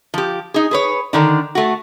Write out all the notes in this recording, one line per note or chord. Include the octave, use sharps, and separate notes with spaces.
F3 G4
D#4 G#4
G#4 B4 C#5
D3 D#3 D4
A3 F#4